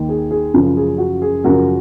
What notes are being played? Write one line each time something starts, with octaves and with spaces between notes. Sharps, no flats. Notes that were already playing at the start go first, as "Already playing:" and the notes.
Already playing: D#2 D#3
G#4
G#4
F#2 C#3 F3
G#4
F#4
G#4
F#2 C#3 F3 F#4 A#4